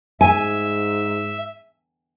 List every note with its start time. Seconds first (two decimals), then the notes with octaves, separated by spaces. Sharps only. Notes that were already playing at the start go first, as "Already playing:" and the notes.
0.21 G#2 E5 G#5